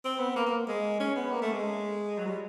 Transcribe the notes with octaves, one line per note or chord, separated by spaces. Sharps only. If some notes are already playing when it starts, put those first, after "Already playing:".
C4
B3
A#3
A#3
G#3
C#4
B3
A#3
A3
G#3
F#3
G3